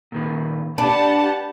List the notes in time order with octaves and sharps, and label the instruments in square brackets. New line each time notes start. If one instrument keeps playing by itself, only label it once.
[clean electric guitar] A#2 D#3 B4
[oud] D4 [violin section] G4 F#5 A5 [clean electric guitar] B4